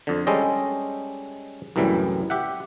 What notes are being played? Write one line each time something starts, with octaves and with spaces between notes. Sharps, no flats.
F2 D3
G3 G#3 C#4 A4 C5 D#5
C2 F#2 A2 E3 G3
G4 E5 F#5